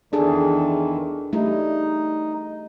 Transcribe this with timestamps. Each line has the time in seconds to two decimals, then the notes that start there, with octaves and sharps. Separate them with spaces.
0.13 E2 D#3 E3 D4 G#4 A4
1.33 G3 A3 D#4 E4